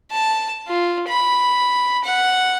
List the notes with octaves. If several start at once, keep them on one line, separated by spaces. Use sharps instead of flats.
A5
F4
B5
F#5